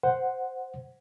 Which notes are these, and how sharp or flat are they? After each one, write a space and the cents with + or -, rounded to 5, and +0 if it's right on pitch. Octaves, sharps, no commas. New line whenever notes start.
C5 +0 F#5 +0